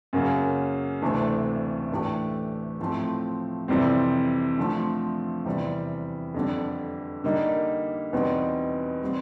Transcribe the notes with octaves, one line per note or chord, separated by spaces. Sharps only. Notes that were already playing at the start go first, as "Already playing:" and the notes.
F#2 C#3 F#3 A#3
D2 C3 E3 A3 D4
A2 E3 A3 D4 G4
A2 F3 A3 C4
F2 C3 E3 G3 C4
D3 F3 A3 C4
E2 C3 E3 G3
F2 D3 G3
D3 G3 A#3 D#4
E2 B2 G3 C4 D#4
E3 G3 C4